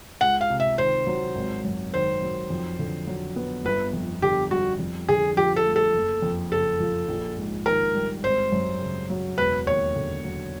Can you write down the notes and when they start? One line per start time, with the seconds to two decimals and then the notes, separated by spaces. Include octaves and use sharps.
0.21 C#2 F#5
0.41 F5
0.50 C3
0.60 E5
0.78 D#3 C5
1.07 F#3
1.36 G#1
1.65 F#2
1.93 D#3 C5
2.22 F#3
2.50 F2
2.79 D3
3.07 F#3
3.36 B3
3.65 G1 B4
3.93 F2
4.22 D3 G4
4.51 G3 F#4
4.80 F2
5.08 D3 G#4
5.37 F3 G4
5.56 A4
5.66 A3
5.76 A4
5.94 F#1
6.22 F2
6.52 C#3 A4
6.80 F3
7.08 A#1
7.37 G#2
7.66 D#3 A#4
7.94 G3
8.24 G#1 C5
8.52 F#2
8.81 C#3
9.10 F#3
9.38 E1 B4
9.67 D#2 C#5
9.96 D3
10.24 F#3